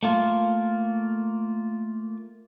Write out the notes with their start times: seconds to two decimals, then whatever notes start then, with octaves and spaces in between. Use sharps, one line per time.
0.03 A3 A#3 F4